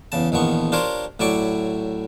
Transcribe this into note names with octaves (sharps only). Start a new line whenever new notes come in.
E2 C#3 A5
A#1 E2 D#3 F3 B3 C#6
D4 F4 G4 A#4 C5 C#5
A2 F#3 E4 D5 C#6 D6